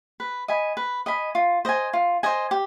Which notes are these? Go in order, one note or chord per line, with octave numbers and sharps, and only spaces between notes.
B4
D#5 G#5 B5
B4
D#5 G#5 B5
F4
C5 D#5 G#5
F4
C5 D#5 G#5
G4